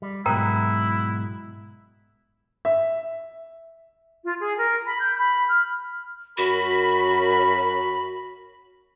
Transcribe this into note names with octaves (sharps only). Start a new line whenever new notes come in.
G3
G#2 B2 F#3 E4 A#4 G5 A#5
E5
F4
G#4
A#4
B5
G6
B5
F6
F#2 F#4 A#4 B5